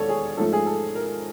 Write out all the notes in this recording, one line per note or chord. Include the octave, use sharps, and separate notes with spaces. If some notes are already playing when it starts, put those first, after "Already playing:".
Already playing: E1 D#2 A4 C#5 D5
G#4
G#2 F3 A3 A4
G#4
A4
A#4